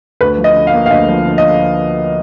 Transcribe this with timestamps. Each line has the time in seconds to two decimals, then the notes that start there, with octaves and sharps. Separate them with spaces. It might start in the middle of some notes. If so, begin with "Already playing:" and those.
0.21 D2 B4
0.38 F3
0.44 D#5
0.56 D3
0.67 F5
0.74 A#3
0.86 F5
0.91 D2 D#5
1.09 F3
1.26 D3
1.38 D#5